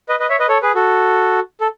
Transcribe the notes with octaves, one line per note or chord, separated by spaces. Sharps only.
B4 D#5
B4 D#5
C#5 E5
B4 D#5
A4 C#5
G#4 B4
F#4 A4
A4